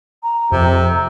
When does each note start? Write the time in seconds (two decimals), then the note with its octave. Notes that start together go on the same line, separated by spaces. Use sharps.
0.23 A#5
0.52 F2 C3